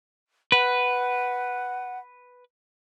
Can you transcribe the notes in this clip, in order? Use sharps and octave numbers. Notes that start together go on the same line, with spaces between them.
B4 F#5